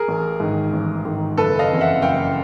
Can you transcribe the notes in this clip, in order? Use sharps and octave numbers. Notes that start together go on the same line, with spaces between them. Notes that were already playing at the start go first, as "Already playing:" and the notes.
Already playing: G#4 A#4
A1
G#2 D#3
A1
G#2 D#3
F#1 A4 B4
D#5 F5
F2 C#3 E3
E5 F#5
F#1 F5 G5